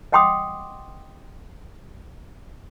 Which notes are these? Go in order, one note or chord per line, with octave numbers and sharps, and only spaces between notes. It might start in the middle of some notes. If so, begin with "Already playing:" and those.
D#5 F#5 G5 C6 D6 D#6